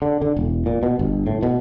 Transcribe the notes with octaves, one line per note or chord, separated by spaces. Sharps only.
D3
D3
E1
A#2
B2
G1
A2
B2